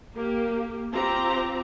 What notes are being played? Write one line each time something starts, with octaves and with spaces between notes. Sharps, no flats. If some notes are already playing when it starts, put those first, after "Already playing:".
A#3 G4
C4 F4 G4 A#5